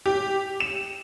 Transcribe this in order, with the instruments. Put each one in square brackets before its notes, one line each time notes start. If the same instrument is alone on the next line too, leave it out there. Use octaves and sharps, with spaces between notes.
[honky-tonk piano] G4
E7